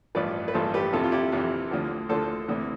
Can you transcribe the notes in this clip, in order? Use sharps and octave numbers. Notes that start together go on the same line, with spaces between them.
A1 G2 F3 B4 D5
B4
A1 G2 F3 A4 C5
G4 B4
F2 C3 E3 F4 A4
F4
E4 G4
F2 C3 E3
D2 D3 F3
D2 D3 F3 A4 C5
D2 C3 E3